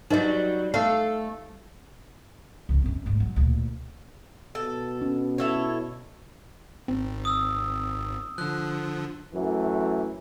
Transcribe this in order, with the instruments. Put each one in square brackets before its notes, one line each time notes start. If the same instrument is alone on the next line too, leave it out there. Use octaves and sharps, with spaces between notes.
[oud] F#3 G3 [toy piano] D#4 B4 D#5
[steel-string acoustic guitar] A3 A4 [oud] F5
[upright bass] C#2 F#2
F#2 C4
D2 G#2
F#3
D2 A#2
[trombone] B2 [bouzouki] A4
[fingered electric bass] C#4
[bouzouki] E4 A4 C#5
[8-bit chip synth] G#1 [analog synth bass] C4
[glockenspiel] D#6 E6
[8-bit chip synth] D3 F3 [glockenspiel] F#6
[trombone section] F#2 E3 A3